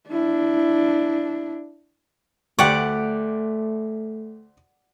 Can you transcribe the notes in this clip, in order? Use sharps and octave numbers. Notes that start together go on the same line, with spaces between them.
D4 E4
D2 A3 G4 D5 F#5 C#6